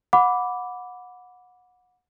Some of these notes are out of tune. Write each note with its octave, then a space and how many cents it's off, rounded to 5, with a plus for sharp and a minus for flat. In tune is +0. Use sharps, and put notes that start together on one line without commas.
F#5 -25 B5 +0 D6 -10